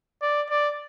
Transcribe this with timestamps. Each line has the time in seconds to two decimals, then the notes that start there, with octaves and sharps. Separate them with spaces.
0.22 D5
0.49 D5